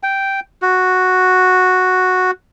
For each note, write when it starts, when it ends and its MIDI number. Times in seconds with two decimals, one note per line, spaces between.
0.03 0.40 79
0.62 2.31 66